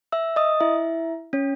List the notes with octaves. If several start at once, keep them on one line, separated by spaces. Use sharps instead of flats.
E5 E6
D#5 D#6
E4 E5
C#4 C#5